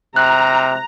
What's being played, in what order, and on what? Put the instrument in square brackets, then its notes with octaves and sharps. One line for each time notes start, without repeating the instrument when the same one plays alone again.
[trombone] C3 [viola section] A#5 [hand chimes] F#6